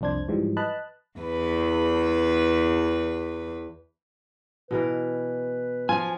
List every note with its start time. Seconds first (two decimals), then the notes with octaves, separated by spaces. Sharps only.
0.01 C2 F2 D4 C5 G#6
0.28 G#2 E3 F3 G3
0.57 B4 D#5 A5 B5 F#6
1.20 E2 B4
4.71 B2 E3 A#4 B4
5.89 F3 F4 G#5